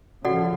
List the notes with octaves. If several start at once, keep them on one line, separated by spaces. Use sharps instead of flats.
C#3 F3 F#4 A4 D5 F#5